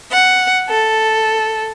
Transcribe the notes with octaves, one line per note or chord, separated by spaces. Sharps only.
F#5
A4